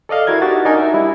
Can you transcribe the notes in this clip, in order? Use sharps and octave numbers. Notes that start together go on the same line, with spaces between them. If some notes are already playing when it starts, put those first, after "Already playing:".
A4 D5 D#5 F5
E4 F#4 A#4 G#6
D#4 F#4 G4 A6
D4 D#4 A#4 G#5
E5
G3 E4